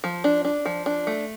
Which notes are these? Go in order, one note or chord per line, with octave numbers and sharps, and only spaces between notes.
F3
D4
D4
F3
D4
A3